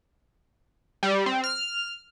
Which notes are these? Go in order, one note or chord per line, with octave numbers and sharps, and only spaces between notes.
G3
C4
F6